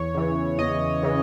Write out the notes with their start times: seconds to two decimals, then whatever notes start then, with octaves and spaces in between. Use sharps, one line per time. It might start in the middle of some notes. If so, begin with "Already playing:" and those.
Already playing: E2 C#5
0.15 C#3 E3
0.58 E2 D#5
1.03 C#3 E3